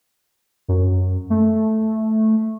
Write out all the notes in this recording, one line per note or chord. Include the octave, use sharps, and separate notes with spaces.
F#2
A3